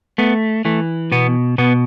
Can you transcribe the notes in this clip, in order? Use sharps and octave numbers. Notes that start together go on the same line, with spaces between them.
A3 B3
E3 A3
B2 B3
B2 B3